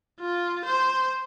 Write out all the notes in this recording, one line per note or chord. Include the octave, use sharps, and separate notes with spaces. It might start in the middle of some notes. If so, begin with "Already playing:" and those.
F4
C5